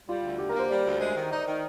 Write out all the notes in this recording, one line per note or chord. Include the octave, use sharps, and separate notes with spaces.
G3 F4
D2
D3 G4
A#4
A#3 C5
G3 D5
D2
G#3 C5
D#3
D#4 D5
D#3